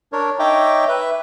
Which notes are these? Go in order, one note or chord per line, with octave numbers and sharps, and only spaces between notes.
D4 A#4 C#5
D#4 C#5 D#5 E5 G5 D6
B4 E5